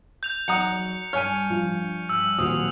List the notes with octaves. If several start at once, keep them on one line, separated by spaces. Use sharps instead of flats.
G6 F7
E2 F#3 D#4 F#5 A#5 D#6 C#7
G2 C#5 G#5 F6 D#7
F3
G2 E6
D#1 F3 F#3 C4 D#6